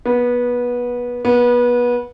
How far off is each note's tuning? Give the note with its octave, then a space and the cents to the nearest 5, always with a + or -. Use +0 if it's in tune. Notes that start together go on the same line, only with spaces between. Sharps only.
B3 -20
B3 -25